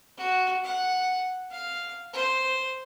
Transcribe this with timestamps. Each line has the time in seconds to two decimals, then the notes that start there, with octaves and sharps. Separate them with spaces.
0.18 F#4
0.64 F#5
1.51 F5
2.13 C5